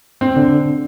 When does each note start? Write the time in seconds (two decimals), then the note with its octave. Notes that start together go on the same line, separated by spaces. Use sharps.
0.21 C4
0.36 D3